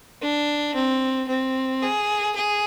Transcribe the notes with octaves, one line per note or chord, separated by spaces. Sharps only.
D4
C4
C4
G#4
G#4